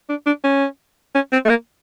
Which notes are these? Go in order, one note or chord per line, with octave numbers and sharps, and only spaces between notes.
D4
D4
C#4
C#4
C4
A3
A#3